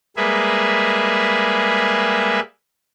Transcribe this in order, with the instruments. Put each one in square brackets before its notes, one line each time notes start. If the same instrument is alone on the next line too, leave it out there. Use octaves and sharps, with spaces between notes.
[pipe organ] G3 G#3 A#3 G#4 B4 E5